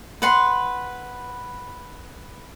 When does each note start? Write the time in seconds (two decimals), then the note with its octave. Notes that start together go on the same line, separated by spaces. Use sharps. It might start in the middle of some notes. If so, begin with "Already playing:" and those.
0.22 B4 F#5 C6